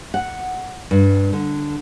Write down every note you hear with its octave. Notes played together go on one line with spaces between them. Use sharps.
F#5
G2
D3